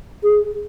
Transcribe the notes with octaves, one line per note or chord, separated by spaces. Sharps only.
G#4